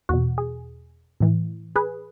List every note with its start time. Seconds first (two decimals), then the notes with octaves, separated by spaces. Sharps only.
0.09 E2 B2 F#4
0.38 G#4
1.20 A2 E3
1.76 G#4 B4